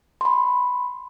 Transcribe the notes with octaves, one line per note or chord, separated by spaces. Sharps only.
B5 C6